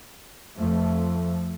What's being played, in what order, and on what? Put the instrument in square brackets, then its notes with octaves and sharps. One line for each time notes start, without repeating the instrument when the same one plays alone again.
[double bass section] F2 F3 A3